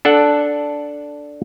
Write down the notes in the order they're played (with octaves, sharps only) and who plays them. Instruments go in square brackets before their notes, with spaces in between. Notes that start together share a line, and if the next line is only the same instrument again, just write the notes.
[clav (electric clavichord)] D4 A4 F#5